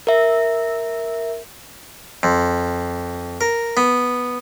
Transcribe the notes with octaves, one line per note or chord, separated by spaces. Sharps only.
A#4 E5
F2
A#4
B3